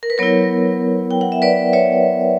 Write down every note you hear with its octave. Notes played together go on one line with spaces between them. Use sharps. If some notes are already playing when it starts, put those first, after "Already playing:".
A#4
B4
F#3 B3 E4 A#4 C#5
G5
F#5
E5
B4 D5
C#5 E5